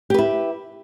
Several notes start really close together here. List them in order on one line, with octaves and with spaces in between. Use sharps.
G4 B4 E4